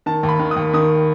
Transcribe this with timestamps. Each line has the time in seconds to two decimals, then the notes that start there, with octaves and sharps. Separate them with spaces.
0.06 D#3 A5
0.23 D#2
0.29 B5
0.39 D#3
0.51 D#6
0.56 D#2
0.73 D#3 D#6